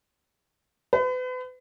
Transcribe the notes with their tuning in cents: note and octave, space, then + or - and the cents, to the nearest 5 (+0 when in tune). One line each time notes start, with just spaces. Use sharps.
B4 +40